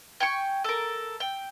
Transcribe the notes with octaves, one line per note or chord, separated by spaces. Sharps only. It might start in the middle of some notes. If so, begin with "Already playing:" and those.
G5 G#5 C#6
A4 A#4
G5